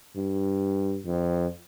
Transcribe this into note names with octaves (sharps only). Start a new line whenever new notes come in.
G2
F2